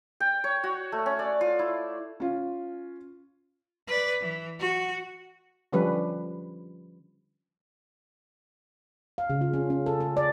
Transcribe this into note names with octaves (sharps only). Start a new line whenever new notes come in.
G5
C#5
F#4
A3
C#4
D5
F4
E4
C#4 F4
B4 D5
E3
F#4
D3 F3 G3 C#4 B4
F5
C#3
F4
C#4
C#4
A4
A4
D5